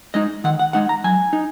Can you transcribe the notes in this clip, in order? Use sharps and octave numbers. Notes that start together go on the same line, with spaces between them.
G#3 D#4 D#5
D#3 F#5
F#5
G#3 D#4 F#5
A#5
F#3 G#5
D#4